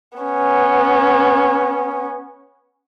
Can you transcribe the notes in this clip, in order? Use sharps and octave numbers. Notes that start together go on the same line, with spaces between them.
B3 C#4